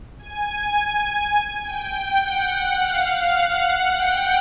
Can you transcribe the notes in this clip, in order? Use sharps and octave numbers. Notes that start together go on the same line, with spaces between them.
G#5
G#5
G5
F#5
F5
F#5
G5